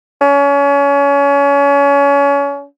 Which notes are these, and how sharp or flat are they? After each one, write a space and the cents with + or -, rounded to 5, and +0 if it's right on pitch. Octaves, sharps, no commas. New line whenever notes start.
C#4 +30